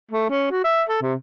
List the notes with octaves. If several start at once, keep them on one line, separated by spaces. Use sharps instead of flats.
A3
C#4
F#4
E5
A4
C3